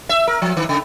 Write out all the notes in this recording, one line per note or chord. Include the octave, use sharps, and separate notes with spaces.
E5
A#4
F3
D#3
C#3